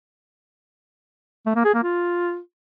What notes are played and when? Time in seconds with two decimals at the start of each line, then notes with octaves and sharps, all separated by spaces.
1.46 A3
1.56 A#3
1.65 G#4
1.74 A#3
1.83 F4